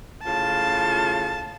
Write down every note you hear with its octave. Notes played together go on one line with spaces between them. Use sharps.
A2 C#3 F4 A5